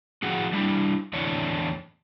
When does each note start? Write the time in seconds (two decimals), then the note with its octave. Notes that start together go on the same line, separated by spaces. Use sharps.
0.22 A2 F3 F#4 G#4 F#5
0.52 G3 D4 E4
1.13 E2 A2 D3 D4 C#5